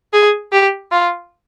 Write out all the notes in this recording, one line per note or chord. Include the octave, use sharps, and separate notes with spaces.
G#4
G4
F4